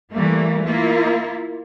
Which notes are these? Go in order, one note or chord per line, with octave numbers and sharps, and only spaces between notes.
E3 G3 A3 A#3
A#3 E4 F4